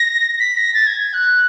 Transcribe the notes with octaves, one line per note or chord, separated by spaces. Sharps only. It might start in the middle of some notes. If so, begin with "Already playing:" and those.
Already playing: A#6
B6
A#6
A6
G#6
G#6
F#6